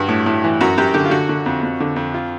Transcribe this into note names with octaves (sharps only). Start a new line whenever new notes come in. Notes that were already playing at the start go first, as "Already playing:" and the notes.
Already playing: G2 F#4
A2
A2
E3
F#2 F#4
F#2 G4
D3 G4
F4
D3 F#4
D3
F2
F2
D3
F2
F4